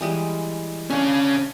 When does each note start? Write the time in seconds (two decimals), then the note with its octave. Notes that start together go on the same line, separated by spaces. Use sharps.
0.01 E3 G3 G#3
0.90 C#3 C#4 D4